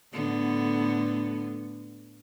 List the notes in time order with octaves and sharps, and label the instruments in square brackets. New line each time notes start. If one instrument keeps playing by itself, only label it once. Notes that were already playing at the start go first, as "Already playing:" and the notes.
[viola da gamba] A2 D3 B3